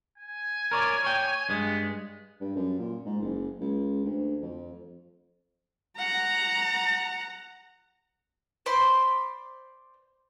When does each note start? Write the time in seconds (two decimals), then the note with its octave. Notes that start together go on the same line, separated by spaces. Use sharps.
0.18 G#5
0.71 A#4 C#5 D5
1.04 C#5 G5
1.49 G2 G#3 B3
2.41 G2
2.56 F#2
2.79 A#2
3.05 G#2
3.20 F#1
3.60 C#2
4.05 D2
4.42 F2
5.98 F#5 A#5
8.66 C5 D5 B5 C6